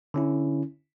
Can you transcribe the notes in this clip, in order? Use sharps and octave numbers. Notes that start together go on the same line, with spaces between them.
D3 C#4 E4